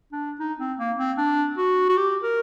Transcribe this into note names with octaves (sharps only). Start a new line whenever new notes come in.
D4
D#4
C4
A#3
C4
D4
F#4
F#4
G4
A#4